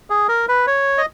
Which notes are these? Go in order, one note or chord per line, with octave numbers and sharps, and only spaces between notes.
G#4
A#4
B4
C#5
D#5